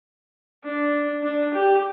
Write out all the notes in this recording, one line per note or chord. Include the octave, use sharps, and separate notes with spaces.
D4
D4
G4